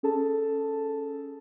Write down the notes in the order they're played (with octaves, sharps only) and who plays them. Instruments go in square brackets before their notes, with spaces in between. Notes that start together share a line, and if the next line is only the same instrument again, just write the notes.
[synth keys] C#4 G#4 A4 A5